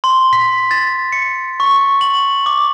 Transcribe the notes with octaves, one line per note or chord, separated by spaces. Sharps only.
C6
B6
A6
C#7
C#6
F#7
D6